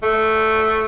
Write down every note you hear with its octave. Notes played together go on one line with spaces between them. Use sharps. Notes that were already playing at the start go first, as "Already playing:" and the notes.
A3